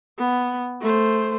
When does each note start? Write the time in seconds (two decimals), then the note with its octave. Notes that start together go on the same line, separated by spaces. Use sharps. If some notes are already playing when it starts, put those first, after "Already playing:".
0.18 B3
0.81 A3 C5